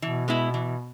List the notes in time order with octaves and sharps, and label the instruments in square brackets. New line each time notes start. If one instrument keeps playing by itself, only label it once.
[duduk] B2 [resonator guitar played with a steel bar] E3
[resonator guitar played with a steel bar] G#3 B3 E4
E3